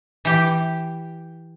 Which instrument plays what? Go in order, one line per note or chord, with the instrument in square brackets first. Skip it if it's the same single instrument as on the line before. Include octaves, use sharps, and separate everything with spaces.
[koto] E3 G4